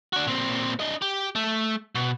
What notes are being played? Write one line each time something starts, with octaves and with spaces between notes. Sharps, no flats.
D4 F#4
A#2 C4
D4 D#5
G4
A3
B2